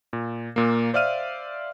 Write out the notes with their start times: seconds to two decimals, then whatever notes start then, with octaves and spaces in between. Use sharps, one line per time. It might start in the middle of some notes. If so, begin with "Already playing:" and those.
0.13 A#2
0.56 A#2 A#3
0.94 C5 D5 E5 F5 F6 D#7